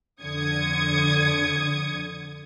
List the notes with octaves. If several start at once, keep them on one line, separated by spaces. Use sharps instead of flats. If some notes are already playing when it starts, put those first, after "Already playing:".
F2 D3 D#6 G#6 C#7